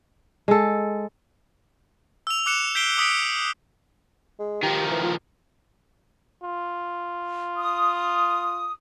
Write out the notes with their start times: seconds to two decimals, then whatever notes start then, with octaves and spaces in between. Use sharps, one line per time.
0.48 G#3 A4
2.27 E6 F7
2.46 D6 F#6 C#7 E7
2.75 G6 B6 C7 D7 G7
2.97 D6 D#6 B6 D7
4.39 G#3
4.63 D#3 F3 G4
4.91 E3
5.03 F4
6.43 F4
7.56 D#6